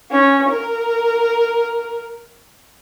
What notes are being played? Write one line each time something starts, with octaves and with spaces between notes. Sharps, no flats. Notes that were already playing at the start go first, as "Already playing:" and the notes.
C#4
A#4